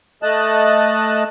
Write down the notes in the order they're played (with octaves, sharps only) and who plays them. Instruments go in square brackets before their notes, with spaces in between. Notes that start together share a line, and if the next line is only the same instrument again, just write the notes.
[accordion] A3 D#5 A5 F#6